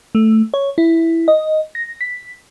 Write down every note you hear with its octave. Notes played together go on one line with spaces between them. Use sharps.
A3
C#5
E4
D#5
A#6
B6